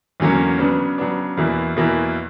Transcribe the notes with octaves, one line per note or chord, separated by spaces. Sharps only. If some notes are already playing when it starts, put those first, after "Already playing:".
E2 D3 F#3 A#3 C#4
C#3 F#3 B3 D4
C#3 F#3 B3 D4
E2 B2 A#3 E4
E2 B2 A#3 E4